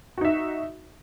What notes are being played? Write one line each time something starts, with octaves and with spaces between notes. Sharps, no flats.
D#4 F#4 E5